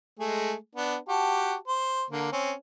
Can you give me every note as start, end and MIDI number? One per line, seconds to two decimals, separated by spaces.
0.20 0.54 56
0.20 0.54 57
0.20 0.54 68
0.75 0.96 59
0.75 0.96 62
1.09 1.54 66
1.09 1.54 67
1.09 1.54 81
1.68 2.03 72
2.11 2.28 50
2.11 2.28 58
2.32 2.53 60
2.32 2.53 61